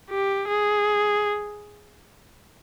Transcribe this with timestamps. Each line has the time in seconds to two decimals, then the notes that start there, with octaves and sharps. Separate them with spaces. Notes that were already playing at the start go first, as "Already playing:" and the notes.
0.11 G4
0.48 G#4